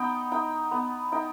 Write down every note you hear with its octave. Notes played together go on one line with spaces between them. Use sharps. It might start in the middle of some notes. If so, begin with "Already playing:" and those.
Already playing: B3 D#4 D#5 G5
D#4 G5
B3
D#4 G5